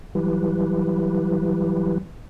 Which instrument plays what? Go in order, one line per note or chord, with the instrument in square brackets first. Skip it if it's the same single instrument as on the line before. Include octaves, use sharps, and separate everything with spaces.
[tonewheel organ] E3 F#3 G3 E4 G4 B4